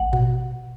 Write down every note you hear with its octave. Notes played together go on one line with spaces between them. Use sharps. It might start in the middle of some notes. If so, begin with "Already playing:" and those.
Already playing: A1 F#5
B2